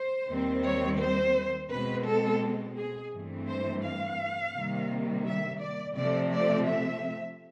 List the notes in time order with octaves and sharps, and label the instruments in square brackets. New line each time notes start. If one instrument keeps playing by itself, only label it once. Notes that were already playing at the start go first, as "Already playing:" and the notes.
Already playing: [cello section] C5
D#2 D#3 G3 C4
C#5
C5
B2 G#3 C4 B4
A4
G#4
G2 E3 A3 C4
C5
F5
C3 D#3 G3 A#3
E5
D5
C3 F3 A3 C4 D5
D5
E5